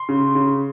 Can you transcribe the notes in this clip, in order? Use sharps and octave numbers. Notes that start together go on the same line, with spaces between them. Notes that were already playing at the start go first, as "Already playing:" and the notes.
Already playing: C6
C#3
C#3